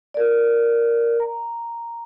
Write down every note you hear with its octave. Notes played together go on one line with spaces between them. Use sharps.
A#4 D5
A#5